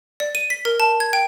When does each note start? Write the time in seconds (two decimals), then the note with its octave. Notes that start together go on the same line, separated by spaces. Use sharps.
0.20 D5
0.35 D#7
0.50 B6
0.65 A#4
0.80 A5
1.00 G#6
1.13 G5